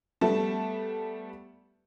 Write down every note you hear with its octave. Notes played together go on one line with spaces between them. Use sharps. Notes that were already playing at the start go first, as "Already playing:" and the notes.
G3 A3 B3 A5